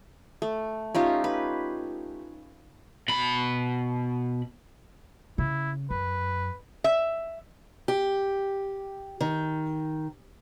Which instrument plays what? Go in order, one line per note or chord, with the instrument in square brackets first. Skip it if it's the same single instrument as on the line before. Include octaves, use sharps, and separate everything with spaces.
[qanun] A3
C#4 D#4 F4 G4
B4
[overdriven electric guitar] B2 B5
[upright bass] C#3 [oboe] E4
[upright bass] F#2 [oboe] B4
[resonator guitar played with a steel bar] E5
[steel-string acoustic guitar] G4
D#3